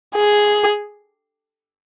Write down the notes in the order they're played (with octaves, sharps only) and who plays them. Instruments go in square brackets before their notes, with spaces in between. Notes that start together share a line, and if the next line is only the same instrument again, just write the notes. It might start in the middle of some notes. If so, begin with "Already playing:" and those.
[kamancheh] G#4